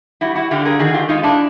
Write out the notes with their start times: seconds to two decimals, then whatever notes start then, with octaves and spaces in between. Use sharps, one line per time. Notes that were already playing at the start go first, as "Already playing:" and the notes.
0.21 G3 E4 F#4
0.35 E4 F#4
0.51 D3 F4 G4
0.65 G#4 A#4
0.79 D#3 F#4 G#4
0.94 F4 G4
1.09 G#3 D#4 F4
1.23 D4 E4